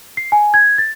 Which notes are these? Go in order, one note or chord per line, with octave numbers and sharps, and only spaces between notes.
C7
G#5
G#6
A6